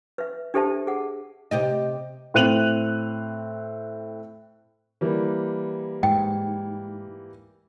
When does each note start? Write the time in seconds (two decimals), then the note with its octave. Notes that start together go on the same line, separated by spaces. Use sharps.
0.18 B4 E5
0.54 D4 G4 A4 C5 E5 A5
0.87 G#4 F#5
1.51 C3 G4 D#5
2.34 A2 C4 F#6 D#7 F7 F#7
5.01 E3 G3 A#3
6.03 G#2 G5